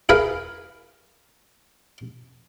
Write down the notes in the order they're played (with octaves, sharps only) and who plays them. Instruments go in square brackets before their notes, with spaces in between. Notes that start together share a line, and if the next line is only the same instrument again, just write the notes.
[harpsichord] E4 G#4 A#4 B4 F5